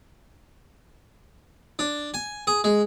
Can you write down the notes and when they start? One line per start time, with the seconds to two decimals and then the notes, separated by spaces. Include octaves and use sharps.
1.79 D4
2.14 G#5
2.47 G#4
2.64 G#3